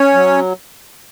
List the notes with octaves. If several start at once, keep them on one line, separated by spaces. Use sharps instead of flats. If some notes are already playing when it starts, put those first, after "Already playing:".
Already playing: C#4 C#5
F#3